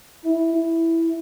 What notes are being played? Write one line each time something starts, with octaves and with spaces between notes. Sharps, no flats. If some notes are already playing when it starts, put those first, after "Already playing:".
E4
E4